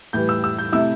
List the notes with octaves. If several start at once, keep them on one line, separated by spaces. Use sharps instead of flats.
A2 E3 G3 G6
E6
E6
G6
C3 A3 E4 E6